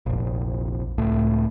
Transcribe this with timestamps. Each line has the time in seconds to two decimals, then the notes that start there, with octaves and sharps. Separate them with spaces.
0.06 F1 A#1
0.98 C#2 A2